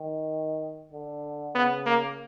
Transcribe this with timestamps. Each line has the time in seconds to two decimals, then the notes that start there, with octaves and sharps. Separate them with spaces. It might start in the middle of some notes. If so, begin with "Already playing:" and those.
Already playing: D#3
0.93 D3
1.55 C#3 B3
1.86 A#3